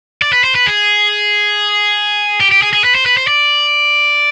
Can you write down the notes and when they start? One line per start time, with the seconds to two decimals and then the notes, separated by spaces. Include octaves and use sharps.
0.22 D5
0.33 B4
0.44 C5
0.55 B4
0.66 G#4
2.40 G4
2.52 G4
2.62 G#4
2.73 G#4
2.84 B4
2.95 C5
3.06 B4
3.17 C5
3.27 D5